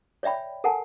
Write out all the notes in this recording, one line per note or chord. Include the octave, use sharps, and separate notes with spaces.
C#5 D5 E5 G5 B5
A4 A#4 F#5 G#5 A5